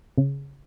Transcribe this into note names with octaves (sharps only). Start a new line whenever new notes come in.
C#3